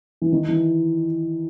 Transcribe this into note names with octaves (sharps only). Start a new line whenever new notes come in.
E3
D#3
E3